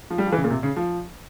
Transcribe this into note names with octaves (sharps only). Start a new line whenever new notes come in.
F3
G3
F3
E3
C#3
A#2
C3
C#3
F3